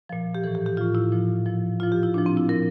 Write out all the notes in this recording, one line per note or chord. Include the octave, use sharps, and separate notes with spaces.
A#2 F3
G4
A2 E3 A4
G4
G4
A2 F3 F4
E4
A#2 F3
A#2 F3
A#2 F3 F4
G4
E4
A#2 F3 D4
C4
E4
A#2 F3 A#4